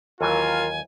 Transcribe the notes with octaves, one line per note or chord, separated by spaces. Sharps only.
D#2 E3 F#3 F4 A#4 G#5